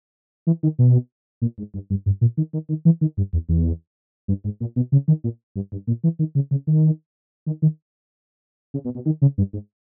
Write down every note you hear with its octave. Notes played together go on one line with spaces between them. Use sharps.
E3
D#3
B2
A#2
G#2
G2
G2
G2
A#2
D#3
D#3
D#3
E3
D#3
G2
E2
E2
G2
G#2
A#2
B2
C#3
D#3
A#2
G2
G2
A#2
E3
D#3
C#3
C#3
D#3
D#3
D#3
C#3
B2
B2
D#3
C#3
G2
G#2